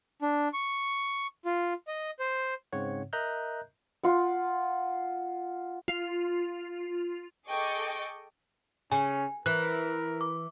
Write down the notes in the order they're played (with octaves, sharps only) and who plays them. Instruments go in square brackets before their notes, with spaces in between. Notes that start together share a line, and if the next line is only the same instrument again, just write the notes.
[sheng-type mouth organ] D4
C#6
F4
D#5
C5
[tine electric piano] G#2 C#3 C4 C#5 F#5
A#4 D#5 E5 A#5 F#6 G6
[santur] F4 F#5
[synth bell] F4
[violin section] G#4 A4 D#5 G5 C#6 D6
[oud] C#3 [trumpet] C#4 [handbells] G#5
[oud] E3 [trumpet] A#4 [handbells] F#6
[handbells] D6